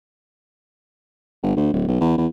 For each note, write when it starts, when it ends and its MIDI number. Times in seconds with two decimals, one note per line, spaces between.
1.42 1.54 31
1.56 1.69 38
1.73 1.84 26
1.88 1.99 35
2.00 2.16 40
2.18 2.27 40